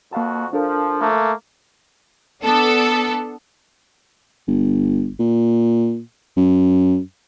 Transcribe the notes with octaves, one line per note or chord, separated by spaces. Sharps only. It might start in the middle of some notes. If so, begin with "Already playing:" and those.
F2 A#3 F#4 F5 A5
F3 D4 A4 A#4
A3 A#3
B3 D4 A4
G1
A#2
F#2